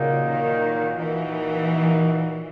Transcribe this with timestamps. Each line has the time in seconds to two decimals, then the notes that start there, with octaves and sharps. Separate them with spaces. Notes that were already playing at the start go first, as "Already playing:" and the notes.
Already playing: A#2 C#3 F#3 A#3 D#4
0.28 D#3
0.97 A#2 E3 A#3 D#4 F#4